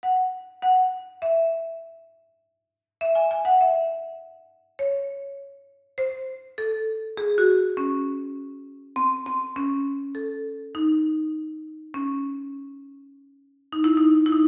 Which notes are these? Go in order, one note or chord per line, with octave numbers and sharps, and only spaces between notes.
F#5
F#5
E5
E5
G#5
G#5
F#5
E5
C#5
C5
A4
G#4
F#4
C#4
C4
C4
C#4
A4
D#4
C#4
D#4
E4
D#4
E4
D#4